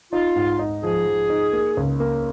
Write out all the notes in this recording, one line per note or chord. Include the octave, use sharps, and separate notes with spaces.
D#4 F4
G#2
D#4
F3 G#4
F3
D#4
A#3
C#2
A#3